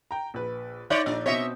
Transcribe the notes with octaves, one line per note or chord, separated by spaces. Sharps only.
G5 A#5
A#1 B4
D#4 C#5 D5 G6
A#1 D4
B2 C4 C#5 D#5 E5